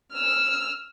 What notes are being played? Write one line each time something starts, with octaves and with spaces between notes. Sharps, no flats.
E6 F6